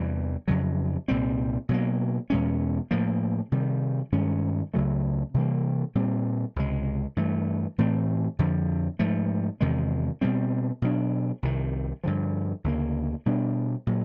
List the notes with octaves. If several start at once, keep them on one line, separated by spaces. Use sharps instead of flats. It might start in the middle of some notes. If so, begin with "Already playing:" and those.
Already playing: E2 C3 E3 G3
F2 C#3 F#3
C2 A#2 G3 C4
B2 F#3 A#3
E2 B2 G#3 C#4
A2 F3 A#3
C3 D#3 G3
G2 D#3 G#3 C#4
C#2 C#3 F#3 A3
C3 E3 G3 A#3
A#2 G3 C4
C#2 C3 D#3 G#3
G2 E3 A3
A2 E3 A3 C4
F2 D3 F3
G#2 F3 A3
E2 C3 D#3 G#3
B2 G3 C4
B2 F#3 B3 D4
C2 C3 D#3
G2 D3 F3
D2 C#3 F#3 A#3
B2 G3 B3 D4
A#2 F#3